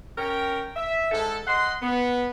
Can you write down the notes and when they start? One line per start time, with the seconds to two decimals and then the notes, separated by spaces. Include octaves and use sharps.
0.18 C#4 A#4 G5
0.75 E5
1.12 G#2 A4
1.47 D#5 F#5 C6
1.82 B3